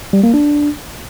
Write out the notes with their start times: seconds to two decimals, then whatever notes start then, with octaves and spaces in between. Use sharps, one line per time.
0.13 G3
0.23 A#3
0.34 D4